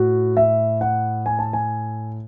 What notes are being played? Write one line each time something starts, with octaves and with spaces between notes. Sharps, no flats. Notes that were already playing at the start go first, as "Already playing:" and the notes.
Already playing: A2 F#4
E5
F#5
G#5
A5
G#5